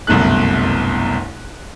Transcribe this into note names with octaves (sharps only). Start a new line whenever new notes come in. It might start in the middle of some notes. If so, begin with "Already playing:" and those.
G1 C2 F#2 B2 A3 F#6